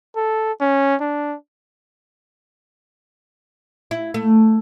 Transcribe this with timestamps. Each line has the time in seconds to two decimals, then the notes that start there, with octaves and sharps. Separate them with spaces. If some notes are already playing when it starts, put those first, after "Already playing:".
0.16 A4
0.60 C#4
1.00 D4
3.91 E4
4.14 A3